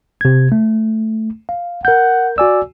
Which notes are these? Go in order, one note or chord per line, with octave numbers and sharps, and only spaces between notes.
C3 G#6
A3
F5
A#4 F#5 G6
F#4 D5 G#5 E6